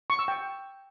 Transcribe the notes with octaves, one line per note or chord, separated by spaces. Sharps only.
C#6
E6
G5